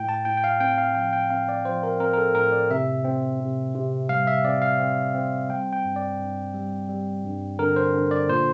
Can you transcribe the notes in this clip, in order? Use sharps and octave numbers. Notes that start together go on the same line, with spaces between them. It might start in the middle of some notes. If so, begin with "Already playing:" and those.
Already playing: A2 G5
A5
A2 G5
G5
F5
C4 G5
F5
F3 G5
G5
C4 F5
D5
F3 C5
A#4
C4 A#4
A#4
A4
A2 A#4
D5
C3 E5
C4
C3
C3
G3 F5
E5
C4 D5
F5
C4
C4
G3 G5
G5
G2
D5
G2
G3
G3
G2
D3 A#4
C5
D3
D5
A#2 C5